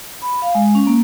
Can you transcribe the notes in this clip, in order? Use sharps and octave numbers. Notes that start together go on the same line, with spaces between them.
B5
F5
G#3
C#4
A#3